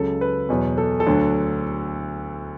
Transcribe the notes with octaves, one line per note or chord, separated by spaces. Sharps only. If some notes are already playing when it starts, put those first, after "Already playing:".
Already playing: C#2 C#3 F#3 A4
B4
E2 B2 F#3
A4
A4
D2 D3 F#3